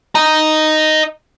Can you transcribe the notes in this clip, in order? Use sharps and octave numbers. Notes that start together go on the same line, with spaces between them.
D#5 A#5